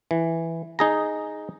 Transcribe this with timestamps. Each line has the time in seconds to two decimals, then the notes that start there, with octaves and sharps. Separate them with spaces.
0.11 E3
0.79 D#4 G#4 A#5